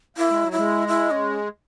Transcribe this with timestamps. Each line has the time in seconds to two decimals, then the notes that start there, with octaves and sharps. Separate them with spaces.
0.17 A#3 E4
0.30 G#3
0.44 F#3
0.52 E4
0.58 G#3
0.88 E4
1.11 C#4